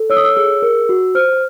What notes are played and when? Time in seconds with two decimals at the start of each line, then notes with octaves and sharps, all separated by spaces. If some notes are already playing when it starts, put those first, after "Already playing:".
Already playing: A4
0.10 C#5 E6
0.17 D#6
0.24 E6
0.36 G#4 E6
0.62 A#4
0.89 F#4
1.15 C5 F6